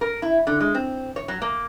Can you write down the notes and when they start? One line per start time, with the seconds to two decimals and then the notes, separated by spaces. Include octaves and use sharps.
0.01 A#4
0.22 E4
0.47 D3
0.60 G#3
0.74 C4
1.16 C#5
1.28 F#3
1.42 A#3